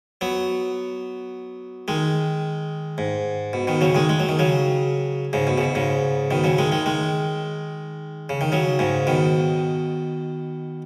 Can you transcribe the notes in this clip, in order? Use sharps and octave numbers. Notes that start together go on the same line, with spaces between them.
F#3 B3
D#3 G#3
G#2
B2
B2 D#3
C#3 F#3
D#3 G#3
G#3
F#3
D#3
C#3 F#3
G#2 C#3
B2
C#3
B2
G#2 C#3
B2 D#3
C#3 F#3
D#3 G#3
D#3 G#3
D#3 G#3
C#3
D#3
C#3 F#3
G#2 C#3
B2 D#3